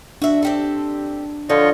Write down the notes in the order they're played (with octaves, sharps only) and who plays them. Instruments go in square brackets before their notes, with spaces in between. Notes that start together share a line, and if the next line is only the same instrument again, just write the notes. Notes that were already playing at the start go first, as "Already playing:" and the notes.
[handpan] D4 [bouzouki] F#4 E5
[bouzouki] C4 G4 A4
[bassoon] D3 [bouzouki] F3 [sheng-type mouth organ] F4 C#5 D#5